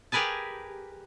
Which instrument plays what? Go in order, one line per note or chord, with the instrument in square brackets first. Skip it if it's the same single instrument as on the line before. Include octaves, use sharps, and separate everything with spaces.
[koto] G4 G#4 A#4 B4 G#5 A5